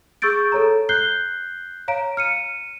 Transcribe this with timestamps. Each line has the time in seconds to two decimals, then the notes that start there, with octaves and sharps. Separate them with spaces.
0.22 G#4 C#6 E6 G6 A6 D7
0.52 A4 C#5 A#5
0.89 F#6 G6 C7 G7
1.88 C#5 F5 A#5 D7
2.17 F6 C#7 D#7